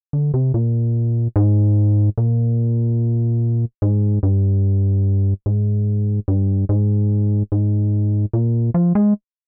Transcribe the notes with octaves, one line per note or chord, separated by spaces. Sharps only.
D3
C3
A#2
G#2
A#2
G#2
G2
G#2
G2
G#2
G#2
A#2
F3
G#3